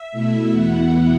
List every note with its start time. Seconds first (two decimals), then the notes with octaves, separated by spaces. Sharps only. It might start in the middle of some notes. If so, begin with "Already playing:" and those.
Already playing: E5
0.12 B2 A3 E4
0.50 E2 B2 B3 E4 F#5